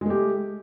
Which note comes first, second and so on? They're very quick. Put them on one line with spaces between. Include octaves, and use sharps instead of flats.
G#3 A3 G4